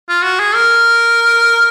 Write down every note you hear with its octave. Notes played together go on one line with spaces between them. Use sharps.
F4
F#4
G#4
A#4